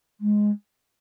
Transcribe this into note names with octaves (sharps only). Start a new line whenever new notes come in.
G#3